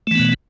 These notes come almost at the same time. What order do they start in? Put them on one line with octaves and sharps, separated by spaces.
A3 E3 B3 B2